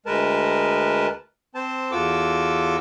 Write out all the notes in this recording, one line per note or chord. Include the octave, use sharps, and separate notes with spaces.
D2 G#3 A#4 B4 A5
C4 C5 A5
E2 F4 F#4 A4 D6 E6